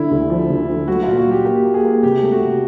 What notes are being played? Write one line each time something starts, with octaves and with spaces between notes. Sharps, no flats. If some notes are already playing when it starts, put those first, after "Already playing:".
Already playing: D3 E4
D2
F3
D2
F3
F#3 F#4
A#2 F4
F#4
F#3 G4
A#3 G4
A#3
G#4
A#3
C3 G4
A3
F#4
C3